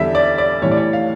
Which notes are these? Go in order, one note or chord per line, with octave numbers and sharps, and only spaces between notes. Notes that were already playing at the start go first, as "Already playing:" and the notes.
Already playing: E2 D3 G3 E5
D5
D5
A2 E3 G3 C#5
D5
C#5
F5